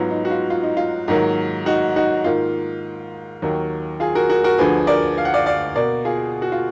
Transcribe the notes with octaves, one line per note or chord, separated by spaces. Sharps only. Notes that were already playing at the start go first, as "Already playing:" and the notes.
Already playing: G#2 F#3 B3 F4
D#4
F#4
F4
F4
D#4
F4
G#2 D#3 F#3 A#3
D#4 F#4
D#4 F#4
G#2 D#3 A#3 F4
D#2 D#3 F#3 A#3
F4 G#4
F#4 A#4
F#4 A#4
F#4 A#4
D2 D3 F3 G#4 B4
A#4 D5
F5
F#5
D5 F5
D5 F5
B2 A#3 A#4 D5
F4 G#4
F#4
F4